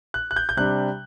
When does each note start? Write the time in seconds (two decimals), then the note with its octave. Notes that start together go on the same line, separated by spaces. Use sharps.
0.14 F#6
0.31 F#6
0.36 G6
0.49 G6
0.57 C3 G3 D4 F#6